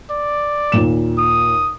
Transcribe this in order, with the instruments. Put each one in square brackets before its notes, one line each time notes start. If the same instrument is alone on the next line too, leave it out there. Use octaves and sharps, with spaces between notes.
[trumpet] D5
[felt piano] D#2 A#2 E7
[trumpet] D#6